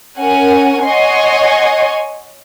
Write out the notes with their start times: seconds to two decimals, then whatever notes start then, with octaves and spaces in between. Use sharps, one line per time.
0.18 C#4 A#4 F#5 G#5
0.83 C#5 D#5 F#5 G#5 C6 C#6